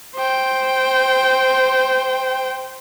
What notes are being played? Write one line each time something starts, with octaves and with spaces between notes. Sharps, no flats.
C5 G5